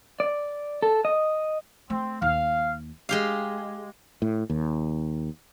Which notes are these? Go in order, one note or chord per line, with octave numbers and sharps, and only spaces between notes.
D5
A4
D#5
A3 C4
D#2 F5
G#3 G4 F5
A2
D#2